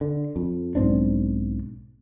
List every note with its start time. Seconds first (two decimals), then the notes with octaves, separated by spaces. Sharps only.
0.01 D3
0.36 F2
0.75 B1 G#2 C4 D4